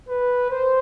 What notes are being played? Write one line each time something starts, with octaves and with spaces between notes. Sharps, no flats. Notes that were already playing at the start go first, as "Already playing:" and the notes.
B4
C5